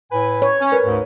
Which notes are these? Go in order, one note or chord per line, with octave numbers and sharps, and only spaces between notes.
A2 B4 G#5
C#5
C#4
A#4 B4
D2 G#2